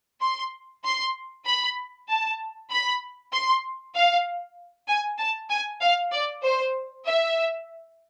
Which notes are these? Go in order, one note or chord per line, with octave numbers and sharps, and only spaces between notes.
C6
C6
B5
A5
B5
C6
F5
G#5
A5
G#5
F5
D5
C5
E5